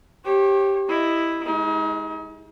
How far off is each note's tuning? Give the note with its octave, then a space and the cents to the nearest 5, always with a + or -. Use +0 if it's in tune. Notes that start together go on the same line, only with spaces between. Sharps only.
G4 +0 C#5 -40
E4 +0 D#5 -5
G#3 +0 D#4 +40